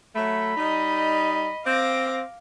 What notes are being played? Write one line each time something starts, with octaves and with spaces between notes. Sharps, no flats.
F#3 A3 B5
G3 D#4 D#5
C4 F5 D6 A#6